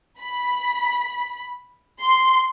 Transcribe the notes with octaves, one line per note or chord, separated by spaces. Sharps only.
B5
C6